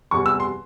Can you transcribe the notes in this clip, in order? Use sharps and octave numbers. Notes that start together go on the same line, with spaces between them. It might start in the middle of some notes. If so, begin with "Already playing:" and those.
E2 C3 G3 C#6
E6
C6